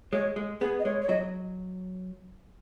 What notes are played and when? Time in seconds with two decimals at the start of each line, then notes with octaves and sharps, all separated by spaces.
0.12 G#3 C#5
0.36 G#3
0.61 B3 G#4
0.79 D#5
0.85 G#3 C#5
1.02 C#5
1.09 F#3 D#5